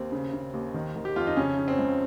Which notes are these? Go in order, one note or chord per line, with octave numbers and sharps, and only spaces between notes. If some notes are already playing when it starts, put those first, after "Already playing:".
Already playing: D#2 C4
C#3
C#3
D#2
D#3
D#3
G4
F2 F4
D#4
C#3 C#4
C#3
C4
C#2